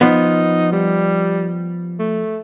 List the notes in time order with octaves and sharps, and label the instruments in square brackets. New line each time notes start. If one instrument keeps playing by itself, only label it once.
[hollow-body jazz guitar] F3 B3 [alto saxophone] D#4
[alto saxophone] G3
A3